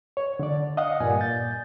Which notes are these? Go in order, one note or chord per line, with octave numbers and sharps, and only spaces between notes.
C#5
D3 D5
D#5 F5 F#5 D#6
G2 A#2 D5 G#5
G6 A6